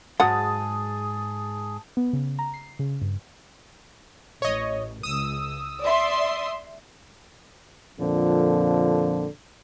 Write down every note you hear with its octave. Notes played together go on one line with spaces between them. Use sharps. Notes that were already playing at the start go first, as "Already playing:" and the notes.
G#2 F#3 G#3 G#4 F#5 A5 D#6
B3
C#3
A#5
C7
C#3
G2
A1 C#5 D#5
C#2 D#6 E6
D5 E5 C6
F2 A#2 D3 F3